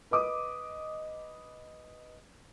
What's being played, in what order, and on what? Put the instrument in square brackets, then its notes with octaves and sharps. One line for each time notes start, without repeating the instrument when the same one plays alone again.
[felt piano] B4 D#5 D6 D#6